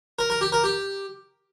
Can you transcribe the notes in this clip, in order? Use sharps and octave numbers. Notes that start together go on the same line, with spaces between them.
A#4
A#4
G4
A#4
G4